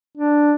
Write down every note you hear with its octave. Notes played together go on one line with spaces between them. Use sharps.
D4